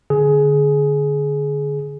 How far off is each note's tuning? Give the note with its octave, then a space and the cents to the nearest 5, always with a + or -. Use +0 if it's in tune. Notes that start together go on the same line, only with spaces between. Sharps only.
D3 +0 G#4 +15